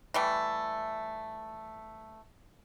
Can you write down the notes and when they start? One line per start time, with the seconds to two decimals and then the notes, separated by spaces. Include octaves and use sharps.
0.14 E3 G3 A3